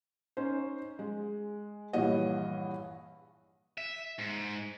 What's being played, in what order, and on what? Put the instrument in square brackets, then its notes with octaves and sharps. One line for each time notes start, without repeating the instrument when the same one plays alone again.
[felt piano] C#4 D#4 C5
G#3
A#1 G2 E3 C#5 D#5 F#5
[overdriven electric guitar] E5
G#2